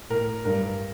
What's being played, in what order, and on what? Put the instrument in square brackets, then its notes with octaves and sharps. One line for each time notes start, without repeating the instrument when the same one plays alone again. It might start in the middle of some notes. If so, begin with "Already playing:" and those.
[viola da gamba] A2 [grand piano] A#4
[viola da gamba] G2 [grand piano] A#4